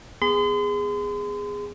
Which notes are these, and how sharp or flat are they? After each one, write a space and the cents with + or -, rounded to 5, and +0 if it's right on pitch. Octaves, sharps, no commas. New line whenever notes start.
B3 +0 G#4 -15 C6 -40